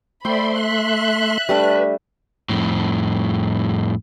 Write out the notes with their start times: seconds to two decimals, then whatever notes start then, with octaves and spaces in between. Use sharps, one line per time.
0.25 A3 C5 D5 G5 B5 C6
0.60 E5 F#6
1.49 G3 A3 D4 B4
2.49 F2 A2